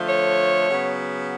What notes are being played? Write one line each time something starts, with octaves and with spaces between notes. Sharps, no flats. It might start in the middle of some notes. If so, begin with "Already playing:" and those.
Already playing: D3 F3 A3
C#5
C#3 F#3 B3